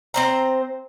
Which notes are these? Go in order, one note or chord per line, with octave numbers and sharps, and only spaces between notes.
C4 C5 A#5